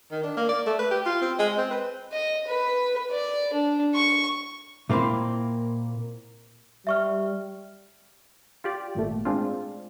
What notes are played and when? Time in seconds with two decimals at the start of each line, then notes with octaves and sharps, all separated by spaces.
0.11 D#3
0.23 D4
0.37 A#3
0.49 D5
0.66 A3
0.79 B4
0.91 G4
1.06 F4
1.21 C4
1.39 G#3
1.58 C4
1.71 B4
2.13 D#5
2.47 B4
3.11 D5
3.53 D4
3.95 C#6
4.89 A#2 A#3 C4 E4 C6
6.87 G3 E5 C#6 F6
8.64 F4 G4 D5
8.95 G#1 A#2 A3
9.25 G#3 C4 D4 F4